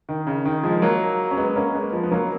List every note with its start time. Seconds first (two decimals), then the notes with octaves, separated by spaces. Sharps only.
0.09 D#3
0.27 C#3
0.45 D#3
0.64 F3 G#3
0.82 F#3 A#3
1.31 C#4
1.37 G#3 B3
1.56 A#3 C#4
1.74 G#3 B3
1.93 F3 G#3
2.03 B3
2.11 F#3 A#3